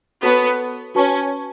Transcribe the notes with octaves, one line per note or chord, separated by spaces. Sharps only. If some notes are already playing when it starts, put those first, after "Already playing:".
B3 F#4 A4 C#5 A5 C#6
C#4 F#4 B4 A5 C#6